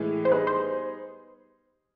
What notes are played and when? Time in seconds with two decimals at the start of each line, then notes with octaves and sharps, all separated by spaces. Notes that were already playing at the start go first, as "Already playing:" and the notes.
Already playing: A2 E3 G#3
0.25 C5
0.32 G3 B3 D#4 G#4 B4
0.47 C5